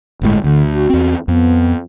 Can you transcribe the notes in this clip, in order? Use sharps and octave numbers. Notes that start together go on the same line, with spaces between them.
G1 A2 G#3
D2 D3
F#4
E2 C4
F2 B3